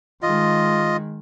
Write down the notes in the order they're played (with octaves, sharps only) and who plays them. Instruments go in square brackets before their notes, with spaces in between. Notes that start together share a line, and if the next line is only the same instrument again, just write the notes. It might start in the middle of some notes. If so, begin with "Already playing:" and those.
[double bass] D#3 G#3 [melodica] F4 D#5